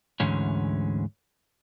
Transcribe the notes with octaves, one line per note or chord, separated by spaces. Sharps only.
D2 G#2 D3 E3 C#4